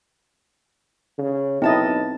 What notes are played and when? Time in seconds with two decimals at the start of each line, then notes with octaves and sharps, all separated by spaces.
1.18 C#3
1.62 B1 C4 D#4 E4 D#5 A5 A6